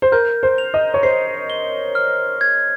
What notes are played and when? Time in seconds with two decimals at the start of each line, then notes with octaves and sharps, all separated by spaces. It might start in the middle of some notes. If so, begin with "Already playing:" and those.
0.02 C5
0.12 A#4 G6
0.43 C5
0.58 F7
0.74 D#5
0.94 C#5
1.03 C5 C7
1.50 G7
1.95 F6
2.41 G#6